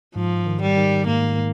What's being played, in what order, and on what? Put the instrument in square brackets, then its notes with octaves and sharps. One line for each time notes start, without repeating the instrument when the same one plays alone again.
[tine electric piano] G#2 [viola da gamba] F3
[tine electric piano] D#3
[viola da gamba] G3
[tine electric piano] D#3
[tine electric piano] G#2 [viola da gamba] A#3